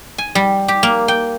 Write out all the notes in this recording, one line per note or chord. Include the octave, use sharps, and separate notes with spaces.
G#5
G3
G4
A#3
G5